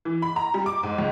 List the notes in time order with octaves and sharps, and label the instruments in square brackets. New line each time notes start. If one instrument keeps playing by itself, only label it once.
[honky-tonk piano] E3
B5
A#5
G3
D6
G#2
C#2